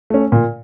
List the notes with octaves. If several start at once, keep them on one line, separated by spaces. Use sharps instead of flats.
A3 C#4
A#2